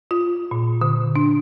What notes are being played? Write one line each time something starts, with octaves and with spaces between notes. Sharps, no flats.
F4
A#2
D3
D4